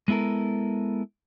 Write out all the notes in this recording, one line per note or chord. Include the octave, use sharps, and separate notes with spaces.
G#3 B3 E4 A4 A#4